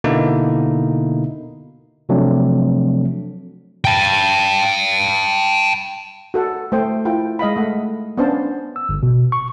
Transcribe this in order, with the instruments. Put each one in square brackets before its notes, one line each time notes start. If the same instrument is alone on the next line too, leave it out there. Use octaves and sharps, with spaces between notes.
[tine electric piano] B2 D3 A#3 B3 D#4 E4
C3 F3 F#3 A3 C4 D4
[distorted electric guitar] G5 A5
[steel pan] F#4 A4 F#5
A3 C5 G5
E4 F4 G5
G#3 D#5 F5 B5
A3 F#5
B3 C#4 D4 C5 F5 A5
[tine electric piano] E6
G1
B2
C#6